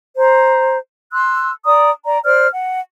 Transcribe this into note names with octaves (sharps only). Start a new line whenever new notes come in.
C5 A#5
C6 E6 F#6
D5 A#5 D#6
D5 A#5
C5 D5 F6
F#5